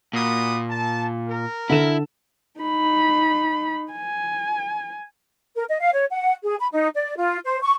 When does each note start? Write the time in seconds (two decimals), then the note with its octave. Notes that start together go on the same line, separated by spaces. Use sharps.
0.13 A#2 F#4 B5 D#6
0.69 A5
1.28 A#4
1.69 D3 E4 A4 E7
2.60 D#4 B5
3.92 G#5
5.56 A#4
5.68 D#5
5.80 F5
5.93 C#5
6.11 F#5
6.44 G#4
6.59 B5
6.72 D#4
6.95 D5
7.17 F4
7.44 C5
7.62 C#6